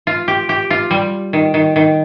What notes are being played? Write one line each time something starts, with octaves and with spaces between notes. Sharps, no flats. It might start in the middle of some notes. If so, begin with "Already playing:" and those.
F4
G4
G4
F4
G3
D#3
D#3
D#3